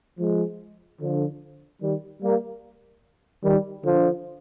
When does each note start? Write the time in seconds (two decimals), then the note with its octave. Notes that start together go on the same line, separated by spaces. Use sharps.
0.18 F3 G#3
1.01 D3 F3
1.81 D#3 G3
2.21 G3 A#3
3.43 D#3 G3
3.84 D3 F3